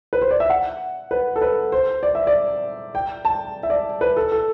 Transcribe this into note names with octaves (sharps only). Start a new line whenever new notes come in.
B4
C5
D5
E5
F#5
B4
A4
B4
C5
D5
E5
D5
G5
A5
E5
D5
B4
A4
A4